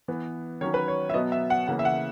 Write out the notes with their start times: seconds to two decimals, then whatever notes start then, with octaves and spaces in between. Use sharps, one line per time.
0.08 E3 B3
0.61 D#3 F#3 C#4 C#5
0.74 B4
0.88 C#5
1.10 E5
1.14 B2 F#3 B3 D#5
1.32 E5
1.50 F#5
1.67 C#3 E3 A#3 C#4 F#5
1.79 E5
1.85 F#5